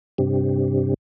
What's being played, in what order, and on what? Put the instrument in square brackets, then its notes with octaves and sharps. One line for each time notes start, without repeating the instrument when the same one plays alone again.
[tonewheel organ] G2 C3